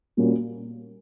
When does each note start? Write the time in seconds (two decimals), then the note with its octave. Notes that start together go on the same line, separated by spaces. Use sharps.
0.17 A#2 G3 A#3 C#4 F#4